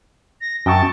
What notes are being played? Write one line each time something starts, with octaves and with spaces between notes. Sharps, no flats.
A#6
F#2 G5 A5 C#6